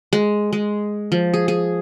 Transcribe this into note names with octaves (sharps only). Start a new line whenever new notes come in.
G#3
G#3
F3
G#4
G#4